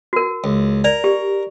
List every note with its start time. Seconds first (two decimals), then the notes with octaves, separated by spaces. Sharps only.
0.13 F#4 A#4
0.44 C#2
0.84 A#4 D5 A#5
1.04 G4